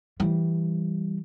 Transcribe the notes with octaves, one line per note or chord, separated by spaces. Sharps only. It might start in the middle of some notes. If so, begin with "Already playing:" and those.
E3 G3